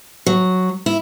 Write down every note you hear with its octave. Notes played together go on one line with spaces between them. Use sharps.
F#3
E4